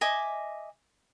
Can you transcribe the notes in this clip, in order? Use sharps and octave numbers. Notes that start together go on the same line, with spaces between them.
D#5 E5 G#5 D6